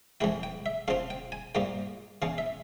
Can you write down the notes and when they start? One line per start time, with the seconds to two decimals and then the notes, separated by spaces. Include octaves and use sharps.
0.20 F2 E3 G#3 E4 G5
0.43 G5
0.66 E5
0.88 C#3 F3 C4 F4 F5
1.10 G5
1.32 G#5
1.55 G#2 G3 A#3 F4 G5
2.22 E2 C#3 E3 F5
2.38 E5